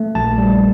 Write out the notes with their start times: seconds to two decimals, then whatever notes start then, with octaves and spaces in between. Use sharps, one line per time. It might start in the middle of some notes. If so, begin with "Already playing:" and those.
Already playing: A3
0.15 A#1 A5
0.38 G3